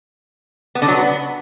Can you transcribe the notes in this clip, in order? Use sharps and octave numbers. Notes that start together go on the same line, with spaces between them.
B3
D3
F#3
B3